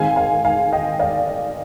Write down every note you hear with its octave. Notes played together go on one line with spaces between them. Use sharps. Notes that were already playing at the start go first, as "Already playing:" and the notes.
Already playing: G#2 D#3 G#3 C4 F5 G#5
F5 G#5
F5 G#5
D#5 G5
D5 F5
D5